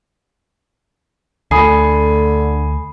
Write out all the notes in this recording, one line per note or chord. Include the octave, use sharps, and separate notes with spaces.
D2 D3 A3 G#5 B5 D#6 C7